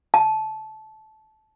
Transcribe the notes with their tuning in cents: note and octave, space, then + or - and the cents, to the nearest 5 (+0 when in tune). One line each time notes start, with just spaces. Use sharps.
A5 -20